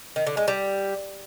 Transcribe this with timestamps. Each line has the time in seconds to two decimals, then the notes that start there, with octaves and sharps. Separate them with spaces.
0.16 D#3
0.27 D3
0.37 G#3
0.48 G3